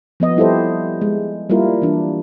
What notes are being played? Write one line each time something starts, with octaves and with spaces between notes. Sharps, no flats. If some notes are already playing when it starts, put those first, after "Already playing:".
F3 B3 D#5
G3 E4 G4 A4 C5
G#3
G3 A#3 E4 F4 A#4
E3 D4